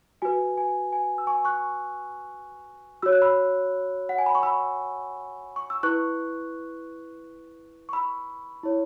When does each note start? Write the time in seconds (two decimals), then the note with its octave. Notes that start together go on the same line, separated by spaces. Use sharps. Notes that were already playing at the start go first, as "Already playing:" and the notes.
0.22 F#4 B4 G#5
0.58 G#5
0.93 G#5
1.18 E6
1.27 G#5 C#6
1.45 C#6 F#6
3.02 F#4 C#5 E6
3.12 F#6
3.22 B5 E6
4.09 F#5
4.18 G#5
4.26 B5
4.35 C#6
4.43 B5 E6
5.56 C#6
5.70 E6
5.83 E4 B4 C#6 F#6
7.89 C#6
7.93 B5 E6
8.63 E4 C#5